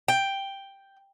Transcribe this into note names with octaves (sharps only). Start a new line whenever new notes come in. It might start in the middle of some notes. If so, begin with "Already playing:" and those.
G5